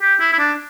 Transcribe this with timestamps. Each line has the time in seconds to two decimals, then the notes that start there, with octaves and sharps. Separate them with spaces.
0.02 G4
0.20 E4
0.33 E4
0.39 D4